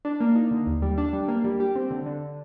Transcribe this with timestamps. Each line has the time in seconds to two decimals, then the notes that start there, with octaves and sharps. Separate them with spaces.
0.05 D4
0.20 A#3
0.36 D#4
0.51 D3
0.67 D#2
0.82 G3
0.98 D4
1.13 G3
1.28 A#3
1.44 G3
1.60 G4
1.76 C4
1.91 D3
2.06 D3